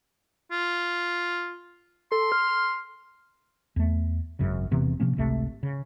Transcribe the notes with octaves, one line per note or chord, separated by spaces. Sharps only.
F4
A4 C6
F6
E2 A3
G#1 F#2 C#3
E1 C3 E3 B3
C3 F3 A#3 C#4
G#1 C#2 C3 A3
C#3